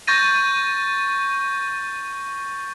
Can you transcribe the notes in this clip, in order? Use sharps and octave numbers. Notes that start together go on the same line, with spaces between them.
C#6 G6 A6 A#6 D#7